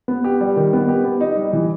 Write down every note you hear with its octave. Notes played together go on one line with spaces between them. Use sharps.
B3
G4
G3
D#3
B3
G4
B3
D#4
G3
E3